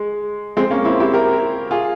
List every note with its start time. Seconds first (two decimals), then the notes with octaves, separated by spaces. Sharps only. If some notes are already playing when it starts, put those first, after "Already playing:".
Already playing: G#3
0.57 G#3 C4
0.71 A#3 C#4
0.85 C4 E4
1.00 E4 G4
1.13 G4 A#4
1.71 F4 G#4